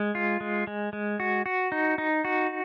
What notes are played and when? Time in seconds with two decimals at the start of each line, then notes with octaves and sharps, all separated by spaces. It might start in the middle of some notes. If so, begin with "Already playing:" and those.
Already playing: G#3
0.15 F4
0.41 G#3
0.67 G#3
0.93 G#3
1.20 F#4
1.46 F#4
1.72 D#4
1.98 D#4
2.25 F#4